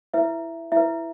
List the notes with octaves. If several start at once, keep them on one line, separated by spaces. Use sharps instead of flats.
E4 B4 E5
E4 B4 E5